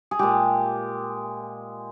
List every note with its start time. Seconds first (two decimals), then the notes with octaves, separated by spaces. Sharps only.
0.11 G#4
0.19 A#2 G#3 G4